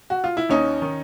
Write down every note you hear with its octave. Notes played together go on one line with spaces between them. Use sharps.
F#4
F4
E4
D#2 C#4 D#4
D#3